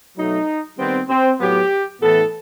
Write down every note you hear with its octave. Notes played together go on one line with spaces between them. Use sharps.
B2 F#3 A3 D#4
D#3 G3 B3 C4
C4
A2 F#3 B3 G4
A2 E3 B3 A4